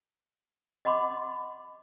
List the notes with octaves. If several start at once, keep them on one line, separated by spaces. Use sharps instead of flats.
D#5 F#5 B5 C6 D6